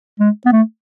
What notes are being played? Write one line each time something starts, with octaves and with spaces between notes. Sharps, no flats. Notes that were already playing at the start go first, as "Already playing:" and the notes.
G#3
B3
A3